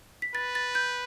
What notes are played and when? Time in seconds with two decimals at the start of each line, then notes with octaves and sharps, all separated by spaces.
0.22 B6
0.34 B4 A6
0.55 A6
0.75 G6